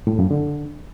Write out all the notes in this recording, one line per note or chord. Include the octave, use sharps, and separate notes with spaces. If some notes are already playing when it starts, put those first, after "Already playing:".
A2
F#2
D3